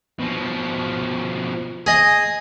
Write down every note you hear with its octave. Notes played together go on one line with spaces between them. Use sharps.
B2 F3
G#4 D#5